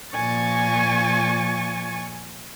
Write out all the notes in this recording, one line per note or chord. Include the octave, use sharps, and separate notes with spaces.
A#2 F3 G#5 C#6 A6